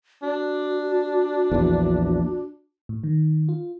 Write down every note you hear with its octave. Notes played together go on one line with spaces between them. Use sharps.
D4 F#4
A#1 E2
A2
D#3
F4